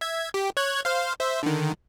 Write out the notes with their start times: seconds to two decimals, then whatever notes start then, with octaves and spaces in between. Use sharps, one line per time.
0.01 E5 G#6
0.34 G4
0.57 C#5 F#6 G#6
0.85 C5 F5
1.19 C5 E5
1.43 D3 D#3